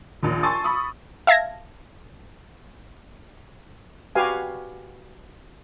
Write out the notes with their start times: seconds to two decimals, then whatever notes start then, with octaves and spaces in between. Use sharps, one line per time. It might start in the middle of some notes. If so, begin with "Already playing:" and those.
0.23 A#1 D#2
0.43 G#5 A5 C6 C#6 E6 A6
0.64 B5 C#6 D#6
1.27 E5 F5 A5 G#6 A#6
4.15 F#4 G4 B4 F5 G#5